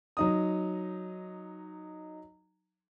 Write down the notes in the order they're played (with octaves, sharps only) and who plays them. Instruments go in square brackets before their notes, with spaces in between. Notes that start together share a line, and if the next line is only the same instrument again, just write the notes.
[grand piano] F#3 D#4 D#6